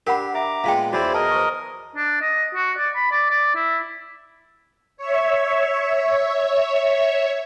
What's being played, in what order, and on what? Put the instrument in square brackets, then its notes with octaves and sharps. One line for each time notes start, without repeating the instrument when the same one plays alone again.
[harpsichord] D4 G4 [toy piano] A#4 F#5 B5
[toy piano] E5 [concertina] A#5 D6
[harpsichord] A#2 G#3 B3 [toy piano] F5 G5
[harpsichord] E2 E3 F#3 [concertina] E4 C5 D5 [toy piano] F#4
[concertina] A#4 D#5 [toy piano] A5
[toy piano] C5 C#6
[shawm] D4
D#5
F#4
D5
B5
D5
D5
E4
[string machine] C#5 E5